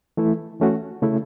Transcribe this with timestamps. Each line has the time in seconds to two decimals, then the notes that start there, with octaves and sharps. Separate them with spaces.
0.17 E3 A3 E4
0.60 E3 A3 C#4 F#4
1.02 C#3 A3 C#4 E4